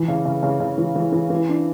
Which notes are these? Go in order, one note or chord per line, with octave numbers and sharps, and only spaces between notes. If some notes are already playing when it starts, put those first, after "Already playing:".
Already playing: E3
C#3
C#3
C#3
C#3
E3
E3
E3
E3
D4